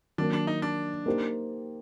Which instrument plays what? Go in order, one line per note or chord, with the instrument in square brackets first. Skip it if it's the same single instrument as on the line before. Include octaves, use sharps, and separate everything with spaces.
[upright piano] D#3 F#3 A#3 [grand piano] D4
[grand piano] D4
D#4
D4
[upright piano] A#3 D#4 G4 C5